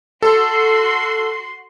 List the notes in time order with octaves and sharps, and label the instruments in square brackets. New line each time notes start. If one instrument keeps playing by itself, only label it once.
[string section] F#4 C6 [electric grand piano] A4